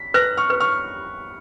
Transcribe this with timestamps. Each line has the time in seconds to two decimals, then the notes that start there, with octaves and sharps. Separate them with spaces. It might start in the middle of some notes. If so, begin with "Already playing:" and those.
Already playing: B6
0.14 B4 F#6 A#6
0.37 C#6 F6
0.50 B4
0.60 C#6 F6